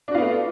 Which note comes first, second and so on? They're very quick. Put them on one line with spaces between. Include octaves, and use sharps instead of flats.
D4 F#4 F4 B3 A3